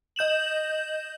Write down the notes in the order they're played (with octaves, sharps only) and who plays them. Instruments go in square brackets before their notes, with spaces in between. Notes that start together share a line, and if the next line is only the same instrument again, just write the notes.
[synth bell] D#5 G6 E7 F#7